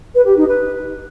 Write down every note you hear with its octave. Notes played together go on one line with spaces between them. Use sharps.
B4
G4
D#4
B4